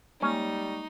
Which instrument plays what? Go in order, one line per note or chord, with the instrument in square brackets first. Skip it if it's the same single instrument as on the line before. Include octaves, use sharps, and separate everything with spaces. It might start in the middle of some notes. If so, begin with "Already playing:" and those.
[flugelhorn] G3 [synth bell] G#3 A#3 C#6 [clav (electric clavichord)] C#4 [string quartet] D#4